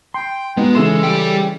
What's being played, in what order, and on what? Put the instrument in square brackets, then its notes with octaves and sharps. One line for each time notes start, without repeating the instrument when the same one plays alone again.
[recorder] G5 [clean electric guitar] C6
[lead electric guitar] G#3 [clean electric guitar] B3 [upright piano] D#4 F#4
[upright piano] C#3 E3 E7 [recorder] A4 [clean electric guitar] C6
[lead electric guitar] G3 G5